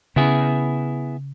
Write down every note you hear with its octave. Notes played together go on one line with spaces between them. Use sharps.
C#3 B3 C#4 E4 G#4